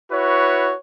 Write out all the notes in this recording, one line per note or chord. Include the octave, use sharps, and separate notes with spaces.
E4 F#4 B4 C#5